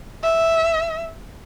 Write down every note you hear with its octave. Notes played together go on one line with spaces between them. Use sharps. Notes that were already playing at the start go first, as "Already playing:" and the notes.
E5